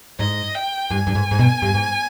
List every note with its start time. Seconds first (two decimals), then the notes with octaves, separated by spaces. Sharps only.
0.19 G#2 D#5
0.55 G5
0.90 G2 G#5
1.07 G2
1.15 G#2
1.31 G#2
1.39 B2
1.62 G2
1.74 G#2